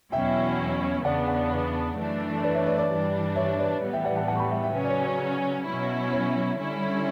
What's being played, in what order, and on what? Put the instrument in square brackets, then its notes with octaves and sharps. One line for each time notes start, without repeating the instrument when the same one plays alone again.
[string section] E2 B2 F#3 C#4 E4 [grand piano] E5 G5
[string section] E2 C#3 E3 B3 D4 [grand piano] D5 F#5
[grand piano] D5 F#5
B4 D5
[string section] F#2 E3 A3 D4
[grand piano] B4 D5
C#5 E5
B4 D5
B4 D5
[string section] G2 E3 G3 D4
[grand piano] C#5 E5
B4 D5
[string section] A2 E3 G3 B3
[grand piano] E5 G5
D5 F#5
F#5 A5
F#5 A5
C#6
G5 B5
E5 G5
E5 G5
[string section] C#3 F#3 C#4 [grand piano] B4
[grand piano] D5
C#5
C#5
[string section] B2 F#3 C#4 E4
[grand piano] C#5
[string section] D3 G3 C#4 E4